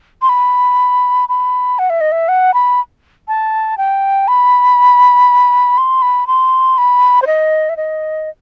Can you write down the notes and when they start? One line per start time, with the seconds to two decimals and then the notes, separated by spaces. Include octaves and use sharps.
0.22 C6
0.29 B5
1.29 B5
1.79 F#5
1.90 E5
2.01 D#5
2.12 E5
2.29 F#5
2.54 B5
3.28 A5
3.78 G5
4.28 B5
5.78 C6
6.02 B5
6.27 C6
6.78 B5
7.22 C5
7.27 D#5
7.69 E5
7.77 D#5